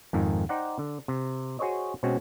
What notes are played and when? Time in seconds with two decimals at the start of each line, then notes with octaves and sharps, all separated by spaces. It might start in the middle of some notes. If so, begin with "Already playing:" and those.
0.13 F2 G#2 D#3
0.49 D#4 C5 D5 F#5 G5
0.79 D3
1.08 C3
1.59 F#4 G#4 C5 C#5 D#5
2.03 B2 G#3 C4 C#4 F#4